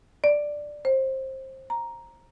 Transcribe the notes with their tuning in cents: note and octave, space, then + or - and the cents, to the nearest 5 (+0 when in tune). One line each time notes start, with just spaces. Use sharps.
D5 +5
C5 +20
A#5 +5